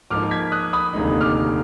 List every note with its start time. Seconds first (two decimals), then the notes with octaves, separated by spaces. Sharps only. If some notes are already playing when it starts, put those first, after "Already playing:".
0.10 G#2 F3 A#3 D#4 D6 F6
0.31 G#6 B6
0.52 D#6 F#6
0.73 B5 D#6
0.93 F1 D#2 D3 G#3 D#4
1.21 D6 F6